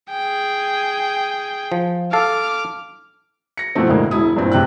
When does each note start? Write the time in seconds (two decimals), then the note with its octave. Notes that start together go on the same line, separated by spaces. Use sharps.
0.10 G#4 G5
1.72 F3
2.13 A4 F5 A5 D6 F6
3.57 A#6 C#7
3.75 B2 E3 F3 A3 C4
3.88 D2 A2 D3 G#3 A#3
4.11 E1 E4 D#6
4.37 G2 A#2 E3 C4
4.52 A#1 C3 G5 F#6